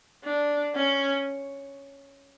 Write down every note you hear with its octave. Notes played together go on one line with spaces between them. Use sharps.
D4
C#4